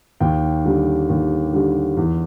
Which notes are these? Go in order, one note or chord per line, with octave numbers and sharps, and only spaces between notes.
D#2 G5
D3 G3
D#2
D3 G3
E2